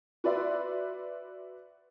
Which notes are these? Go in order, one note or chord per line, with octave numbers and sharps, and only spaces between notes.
F#4 B4 D5 E5 C6